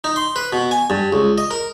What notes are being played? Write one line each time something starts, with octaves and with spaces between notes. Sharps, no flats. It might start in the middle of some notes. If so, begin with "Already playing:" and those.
D#4
C6
B4
B2
G#5
G2
C#2
D#5
A#4